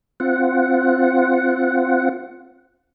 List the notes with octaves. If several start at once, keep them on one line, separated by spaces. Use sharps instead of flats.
C4 F4 F#5